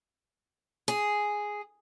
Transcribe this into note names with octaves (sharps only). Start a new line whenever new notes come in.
G#4